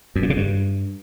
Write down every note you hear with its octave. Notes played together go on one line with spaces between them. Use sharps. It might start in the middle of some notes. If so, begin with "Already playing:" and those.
F#2
A#2
C#3
G2